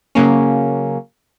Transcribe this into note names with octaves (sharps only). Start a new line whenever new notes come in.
C#3 F#3 A#3 C#4